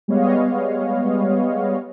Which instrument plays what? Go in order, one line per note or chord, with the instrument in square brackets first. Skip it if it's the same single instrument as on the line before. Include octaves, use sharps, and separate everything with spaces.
[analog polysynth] G3 G#3 B3 C#5 D#5 F5